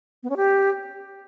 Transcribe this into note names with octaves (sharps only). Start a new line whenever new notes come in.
B3
C#4
G4